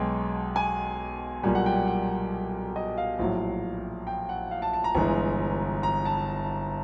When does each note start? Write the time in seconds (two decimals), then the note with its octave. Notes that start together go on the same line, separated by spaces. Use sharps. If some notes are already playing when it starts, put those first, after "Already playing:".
Already playing: B1 B2 G#3 G5
0.56 G#5
1.43 B1 A#2 G3 G#5
1.55 F#5
1.66 G5
1.87 F#5
2.76 D#5
2.98 F5
3.19 A#1 A2 F#3
4.07 G5
4.29 F#5
4.51 F5
4.62 A5
4.73 A5
4.84 A#5
4.95 G1 G2 E3 G#3
5.83 A#5
6.05 A5